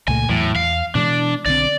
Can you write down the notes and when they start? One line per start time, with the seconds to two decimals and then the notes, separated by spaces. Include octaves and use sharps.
0.08 C#2 A#2 A3 G#5
0.29 E2 A2 E3 F#3
0.56 E2 F5
0.95 B2 E3 G#3 D4
1.46 B1 D3 C4 D5